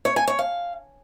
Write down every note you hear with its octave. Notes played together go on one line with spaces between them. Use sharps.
C#5
G#5
C#5
F5